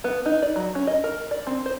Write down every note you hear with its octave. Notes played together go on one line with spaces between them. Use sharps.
B3
D#4
D5
F#3
C#4
D#5
A#4
D5
C4
C5